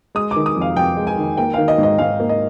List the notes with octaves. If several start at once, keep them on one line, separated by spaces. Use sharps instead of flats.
G#3 D#6
D#3 D6
D#6
F2
F5
F2 G5
G#3
G#5
D#3
A#3 G5
D#3 F5
D#5
G#2
D#5
G#2 F5
A#3
D#5